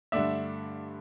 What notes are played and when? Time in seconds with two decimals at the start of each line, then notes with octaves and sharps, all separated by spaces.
0.12 G2 D3 A3 D4 E5